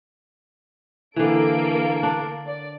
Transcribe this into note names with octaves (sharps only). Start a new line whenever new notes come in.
D3 E3 A#3 A4 D7
D4
D5